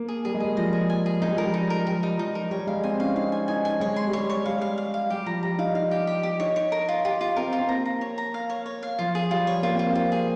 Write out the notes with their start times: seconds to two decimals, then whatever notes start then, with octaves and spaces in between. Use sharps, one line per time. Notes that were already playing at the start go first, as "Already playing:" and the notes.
Already playing: A#3
0.08 G#4
0.25 G3 G#4
0.34 G#3
0.40 G3 G#4
0.57 F3 D#5
0.73 G#4
0.90 G#5
1.06 G#4
1.21 G#3 D#4
1.29 G3
1.37 F3 A#4
1.44 G3
1.54 D#4
1.70 A#4
1.87 G3 A#4
2.03 D#4
2.19 F3 D#4
2.35 A#4
2.51 G3 C#5
2.67 G#3 F5
2.83 C4 G#5
3.00 C#4 F5
3.16 D#4 F5
3.32 G#5
3.48 D#4 G#5
3.65 G#5
3.80 G#3 C#5
3.96 C6
4.07 G3
4.13 G#3 C#5
4.30 C#5
4.45 G3 F5
4.61 F5
4.78 F5
4.94 F5
5.10 G3 G4
5.26 F3 A#5
5.43 G3 A#5
5.58 D#4 F5
5.75 D#4 F5
5.91 G4
6.07 G4
6.23 G4
6.40 D#4 C#5
6.56 C#5
6.72 A#4
6.89 F4
7.05 F4 G4
7.21 F4
7.37 C4 A#4
7.53 F4
7.60 C4
7.69 A#3 A#5
7.86 A#5
8.01 C#5
8.18 A#5
8.34 F5
8.50 C#5
8.66 C#5
8.83 F5
8.99 F3 F4
9.15 G#4
9.30 G3 F4
9.47 C#5
9.63 A#3 F4
9.75 C4 F4
9.88 A#3
9.95 F4
10.12 G#4